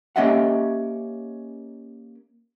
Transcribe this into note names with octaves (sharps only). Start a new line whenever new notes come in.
A#3 C#4 G4 D#5 E5 F#5